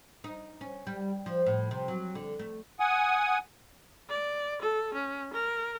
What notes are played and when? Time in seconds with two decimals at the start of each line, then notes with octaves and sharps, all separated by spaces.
0.24 D#4
0.61 C#4
0.87 G3
1.26 F3
1.46 A2
1.71 C3
1.88 F#3
2.15 D3
2.39 A3
2.79 F#5 G#5 D#6
4.09 D5
4.61 A4
4.93 C#4
5.33 A#4